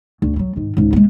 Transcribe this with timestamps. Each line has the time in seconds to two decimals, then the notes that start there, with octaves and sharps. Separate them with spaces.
0.22 D2
0.36 E3 F#3
0.56 G#2 D#3
0.77 C#2 G#2
0.93 G#3 A#3